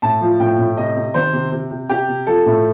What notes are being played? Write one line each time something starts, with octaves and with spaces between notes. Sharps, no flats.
A2 A5
F3
A2 G5
A2
C3 D#5
C3
D#3 C5
C3
C3
C3
C3 G4
C3
F3 A4
A2